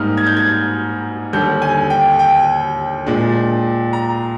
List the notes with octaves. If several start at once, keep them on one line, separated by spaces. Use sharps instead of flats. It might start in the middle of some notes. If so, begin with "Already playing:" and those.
Already playing: G#2 G3 A#3 D#4 F6
G#6
G6
G#6
D#2 D3 G3 G6
G#5
G5
G5
A#2 G#3 D4
A#5